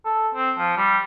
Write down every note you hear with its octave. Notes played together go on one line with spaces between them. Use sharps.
A4
C4
F3
G3